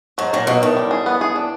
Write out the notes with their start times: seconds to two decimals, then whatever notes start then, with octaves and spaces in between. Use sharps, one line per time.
0.18 G#2 F#3
0.33 A#2 F#3
0.47 B2 F#3
0.62 A2 D#3
0.77 G3
0.91 G#4
1.06 B3
1.21 G#4
1.36 D4